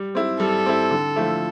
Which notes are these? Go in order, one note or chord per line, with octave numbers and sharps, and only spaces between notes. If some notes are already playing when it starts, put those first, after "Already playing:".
Already playing: G3
C4 E4
G3 A4
C4 E4
D3
F3 A3 E4